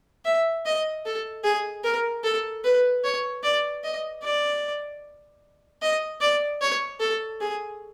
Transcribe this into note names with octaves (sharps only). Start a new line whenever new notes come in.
E5
D#5
A4
G#4
A#4
A4
B4
C#5
D5
D#5
D5
D#5
D5
C#5
A4
G#4